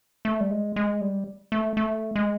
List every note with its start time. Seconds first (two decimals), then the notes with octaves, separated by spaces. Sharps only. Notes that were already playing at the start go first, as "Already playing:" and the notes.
0.25 A3
0.40 G3
0.51 G#3
0.76 G#3
1.01 G3
1.52 A3
1.77 A3
2.16 G#3